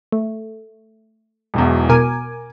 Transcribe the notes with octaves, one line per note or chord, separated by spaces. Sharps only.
A3
E1 B1 E2
B2 A#4 G#5 D6